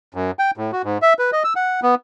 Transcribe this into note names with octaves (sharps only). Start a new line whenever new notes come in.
F#2
G5
A2
F#4
G#2
E5
B4
D#5
E6
F#5
B3